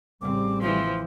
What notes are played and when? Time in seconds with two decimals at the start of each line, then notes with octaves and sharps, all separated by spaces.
0.21 A1 C#3 G3 C4 D6
0.61 E3 F3 C6